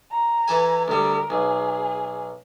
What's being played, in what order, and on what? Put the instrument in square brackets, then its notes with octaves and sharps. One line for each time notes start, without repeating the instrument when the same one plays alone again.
[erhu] A#5
[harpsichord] E3 A4 G#5
[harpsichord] D2 G3 [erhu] A#4
[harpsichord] B1 [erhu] G#4